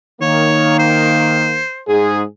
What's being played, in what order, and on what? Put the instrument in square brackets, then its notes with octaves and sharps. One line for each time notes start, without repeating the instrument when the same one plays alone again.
[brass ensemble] D#3 A#3 [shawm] C#5
[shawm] C5
[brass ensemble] G#2 G#4